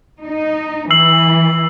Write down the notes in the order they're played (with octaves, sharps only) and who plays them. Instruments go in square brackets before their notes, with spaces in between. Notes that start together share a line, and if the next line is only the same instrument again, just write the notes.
[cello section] D#4
[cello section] E3 [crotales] E6 C7 F#7